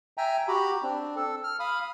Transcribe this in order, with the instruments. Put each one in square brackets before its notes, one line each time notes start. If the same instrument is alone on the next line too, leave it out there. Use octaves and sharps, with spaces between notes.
[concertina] E5 G5 G#5 A#5
F#4 G4 A#5 B5
C4 D4
A4
F6
F5 B5 D#6